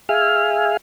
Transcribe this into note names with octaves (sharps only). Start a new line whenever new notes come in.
G#4 E5 F5 G#5 F6